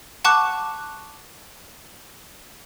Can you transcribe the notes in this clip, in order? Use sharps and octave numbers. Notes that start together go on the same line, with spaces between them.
F#5 A5 C#6 D6 F#6